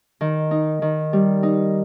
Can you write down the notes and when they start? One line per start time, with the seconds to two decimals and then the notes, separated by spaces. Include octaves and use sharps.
0.21 D#3
0.51 D#4
0.82 D#3
1.13 G3
1.43 D#4